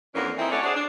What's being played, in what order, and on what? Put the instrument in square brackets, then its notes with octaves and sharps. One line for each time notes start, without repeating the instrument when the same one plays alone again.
[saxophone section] F2 E3 F#3 A#3 C#4 D4
C4 C#4 D#4 E4
A3 C#4 F#4 C#5 D5
D4 F#4 G#4 C5 D5
D4